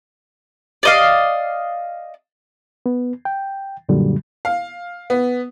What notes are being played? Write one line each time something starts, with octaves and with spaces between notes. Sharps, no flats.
D5 D#5 F5
B3
G5
F#2 A#2 D3 F#3 G3
F5
B3